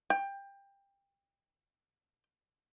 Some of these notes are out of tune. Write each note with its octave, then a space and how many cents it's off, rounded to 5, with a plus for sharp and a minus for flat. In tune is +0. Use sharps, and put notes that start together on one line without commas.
G5 +20